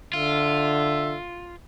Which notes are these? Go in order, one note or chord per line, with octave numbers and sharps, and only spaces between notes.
D3 F4 E5